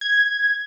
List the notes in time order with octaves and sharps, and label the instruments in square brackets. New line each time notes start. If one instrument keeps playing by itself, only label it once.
[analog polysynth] G#6